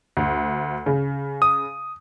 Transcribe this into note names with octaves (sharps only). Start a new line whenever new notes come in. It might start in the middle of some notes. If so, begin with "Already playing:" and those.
D2
C#3
D#6